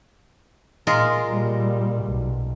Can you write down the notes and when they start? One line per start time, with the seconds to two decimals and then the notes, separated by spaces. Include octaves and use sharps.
0.87 A#2 G#3 F4 A#4
1.28 A#2 G3
2.05 B1